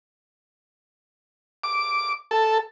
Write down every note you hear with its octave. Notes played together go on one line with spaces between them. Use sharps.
D6
A4